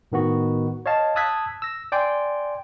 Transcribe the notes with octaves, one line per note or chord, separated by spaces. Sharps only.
A2 D#3 B3 F#4
C#5 D#5 F5 A5
A5 D#6 E6 F#6 G#6 B6
E6 A#6
D5 G5 G#5 C6